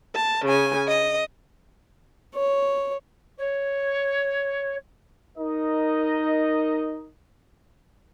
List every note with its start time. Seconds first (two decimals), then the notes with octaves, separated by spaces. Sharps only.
0.15 A5
0.45 C#3 G#5
0.87 D#5
2.35 C#5
3.38 C#5
5.38 D#4 A#4 D#5